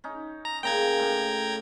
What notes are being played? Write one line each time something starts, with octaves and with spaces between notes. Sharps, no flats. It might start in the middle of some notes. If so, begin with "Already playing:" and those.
C#4 D#4
A#5
A#2 C#3 G5 A#5 G#6
A2